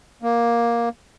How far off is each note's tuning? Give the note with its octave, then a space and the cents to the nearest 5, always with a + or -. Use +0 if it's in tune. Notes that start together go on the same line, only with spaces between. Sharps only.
A#3 +10